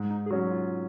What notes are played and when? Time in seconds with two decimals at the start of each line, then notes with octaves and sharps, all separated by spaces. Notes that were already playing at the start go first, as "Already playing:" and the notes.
Already playing: G#2
0.10 D#4
0.26 G#4
0.31 F#3 C#4 F#4
0.51 F4